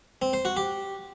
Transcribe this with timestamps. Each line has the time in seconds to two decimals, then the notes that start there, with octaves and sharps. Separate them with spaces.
0.22 C4
0.33 C5
0.45 F#4
0.57 G4